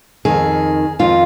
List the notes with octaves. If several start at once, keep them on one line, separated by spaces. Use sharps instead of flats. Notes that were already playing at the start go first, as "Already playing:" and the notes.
F2 D#3 G#4
F2 D#3 F4